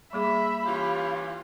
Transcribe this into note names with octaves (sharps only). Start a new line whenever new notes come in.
G3 A#3 G#4 E5 B5
E3 C#4 F4 G4